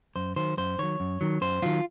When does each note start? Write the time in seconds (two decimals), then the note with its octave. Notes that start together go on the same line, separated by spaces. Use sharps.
0.16 F#2 C5
0.36 D#3 F#3 C5
0.57 F#2 C5
0.79 D#3 F#3 C#5
1.00 F#2
1.21 D#3 F#3
1.41 F#2 C5
1.62 D#3 F#3 F4